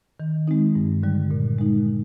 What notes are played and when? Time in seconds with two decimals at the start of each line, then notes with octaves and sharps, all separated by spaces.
0.20 D#3
0.48 G#3 C4 D#4
0.76 G2
1.03 D3 G3
1.31 A#2
1.58 G#3 D#4